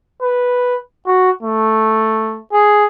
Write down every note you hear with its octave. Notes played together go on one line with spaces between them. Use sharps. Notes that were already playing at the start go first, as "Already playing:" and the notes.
B4
F#4
A3
G#4